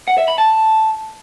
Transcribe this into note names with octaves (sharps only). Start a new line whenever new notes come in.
F#5
E5
B5
A5